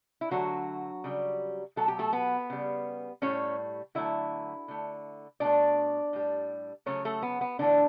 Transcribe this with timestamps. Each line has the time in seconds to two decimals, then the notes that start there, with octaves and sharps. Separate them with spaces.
0.21 E4
0.31 D3 F#3 A3 F#4
1.04 C#3 G3
1.76 B2 F#3 A3 A4
1.88 G4
1.99 A3 A4
2.13 B3 B4
2.50 C#3 G3
3.22 A2 G3 C#4 C#5
3.95 D3 F#3 A3 E4 E5
4.68 D3 A3
5.40 B2 A3 D4 D5
6.13 A2 G3
6.86 C#3 F#3 A3 C#4 C#5
7.05 A3 A4
7.22 B3
7.41 B3
7.59 A2 D3 E3 A3 D4